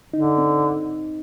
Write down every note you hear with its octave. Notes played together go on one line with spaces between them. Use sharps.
D3 D#4
C4